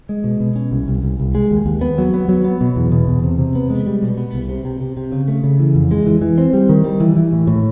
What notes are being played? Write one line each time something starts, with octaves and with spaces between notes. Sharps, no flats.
G#3
B2
B2
C#4
C2
C2
C2
C2
G#3
D#2
D#2
B3
F#3
B3
F#3
B3
B2
E2
B2
E2
C3
C3
B3
G#3
G3
B2
B3
C2
C3
C3
C3
C3
C#3
A3
C#3
E3
F2
G#3
E3
E3
C4
G3
D#3
G3
E3
E3
A2
A2